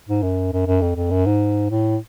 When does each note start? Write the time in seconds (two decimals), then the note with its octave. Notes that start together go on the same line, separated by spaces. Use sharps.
0.09 G#2
0.22 F#2
0.53 F#2
0.67 F#2
0.81 F2
0.96 F2
1.11 F#2
1.26 G#2
1.70 A2